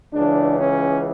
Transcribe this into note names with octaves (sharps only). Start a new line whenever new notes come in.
C#2 C#3 E3 D4
C#4